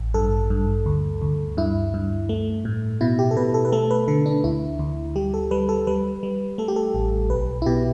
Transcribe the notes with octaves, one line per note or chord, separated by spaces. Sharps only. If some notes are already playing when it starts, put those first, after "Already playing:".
Already playing: A1
G2 A4
G2
D2
D2
G2 E4
G2
A3
A2
B2 E4
G4
A4
B2 B4
A4
B4
A3 A4
B4
D3 A4
D4
D2 E4
D2
G3 G4
A4
G3 B4
A4
G3 B4
G3
A3 A4
G4
A4
A1
B1 B4
E4
B2 G4